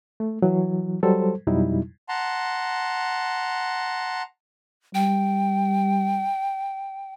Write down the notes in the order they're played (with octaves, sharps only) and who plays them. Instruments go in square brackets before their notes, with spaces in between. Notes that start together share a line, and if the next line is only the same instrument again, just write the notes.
[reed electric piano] A3
E3 F#3
F#3 G3 A4 C5
F2 B2 F#3 G3 D#4 E4
[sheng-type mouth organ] F#5 A5 A#5 C6
[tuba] G3 [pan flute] G5